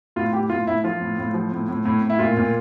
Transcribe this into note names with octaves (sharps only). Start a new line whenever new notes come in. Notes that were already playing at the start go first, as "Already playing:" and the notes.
A2 F4
A2 G4
A2 F4
A2 E4
F3 F4
A2
A2
F3
A2
A2
A2
A2
E4
A#2 F4
A#2